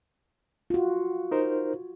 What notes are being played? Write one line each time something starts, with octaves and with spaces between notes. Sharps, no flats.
F4 F#4
D#4 A#4 C5